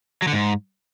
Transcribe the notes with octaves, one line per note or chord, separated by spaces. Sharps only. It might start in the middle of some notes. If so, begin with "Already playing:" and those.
F#3
D3
G#2